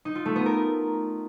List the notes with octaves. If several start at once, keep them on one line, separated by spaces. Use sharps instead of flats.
D#4
F4
A3
B3
A#4